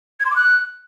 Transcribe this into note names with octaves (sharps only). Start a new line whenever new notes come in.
G#6
C6
D6
F#6